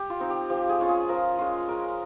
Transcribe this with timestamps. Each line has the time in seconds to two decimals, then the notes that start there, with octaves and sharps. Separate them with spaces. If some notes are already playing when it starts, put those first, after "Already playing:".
Already playing: G4
0.10 F4
0.20 C4 D#4
0.30 G4
0.49 F3 G4
0.69 G#4
0.79 G#3 C#4 F4
0.89 G#4
1.09 F3 A#4
1.38 G#3 C#4 F4
1.68 G#3 A#4